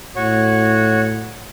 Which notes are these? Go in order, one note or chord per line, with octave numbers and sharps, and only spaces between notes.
A2 F#4 C#5